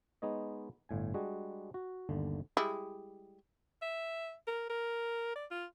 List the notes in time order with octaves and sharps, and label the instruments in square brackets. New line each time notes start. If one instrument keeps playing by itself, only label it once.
[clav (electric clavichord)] G#3 B3 D#4 C#5 D#5
G1 A2 G#5
G3 G#3 D4 F#4 G#4
F#4
G1 D#2 D3
[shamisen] G3 G#3 E4
[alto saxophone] E5
A#4
A#4
D5
F4